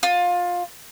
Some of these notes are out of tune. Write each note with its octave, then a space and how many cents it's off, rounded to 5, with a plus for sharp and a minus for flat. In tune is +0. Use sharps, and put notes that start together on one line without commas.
F4 +20